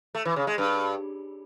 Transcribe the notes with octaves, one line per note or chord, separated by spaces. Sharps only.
A3
E3
C#3
G#3
G2